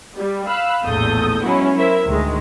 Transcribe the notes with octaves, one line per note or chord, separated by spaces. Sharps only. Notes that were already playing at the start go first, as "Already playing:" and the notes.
G3
F5 B5 E6 F#6
A#1 E2 A2 A4 D#6 G6
F#3 G#3 B3 C#4 E4 F#4
E4 A#4 C5 E5
D2 A2 D#3 G#3